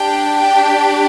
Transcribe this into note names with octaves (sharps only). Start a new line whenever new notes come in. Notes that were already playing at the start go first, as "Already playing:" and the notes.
Already playing: D4 G4 G5
G5